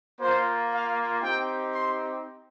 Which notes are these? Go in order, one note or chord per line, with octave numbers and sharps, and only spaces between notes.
A#3 F4 C5
F5
C4 D#4 G4 G5
C6